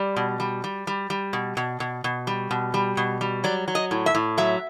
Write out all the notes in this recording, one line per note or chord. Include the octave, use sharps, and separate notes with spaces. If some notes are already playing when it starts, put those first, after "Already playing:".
Already playing: G3 D5
B2
G3
G3
G3
G3
B2
B2
B2
B2
G3
B2
G3
B2
G3
F#3 D5
F#3
D#5
A2
E5
A2
F#3 E5